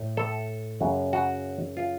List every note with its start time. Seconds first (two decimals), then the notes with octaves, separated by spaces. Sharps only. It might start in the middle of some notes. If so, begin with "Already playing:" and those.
Already playing: A2 A3
0.17 A4
0.81 F#2 C#3 F#3
1.13 F#4
1.77 F4